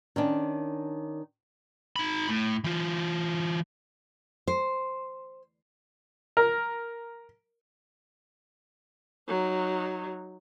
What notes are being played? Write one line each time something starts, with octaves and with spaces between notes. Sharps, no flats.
D#3 C#4 D4
D#4 B5
A2
E3 F4
C5
A#4
F#3 D#4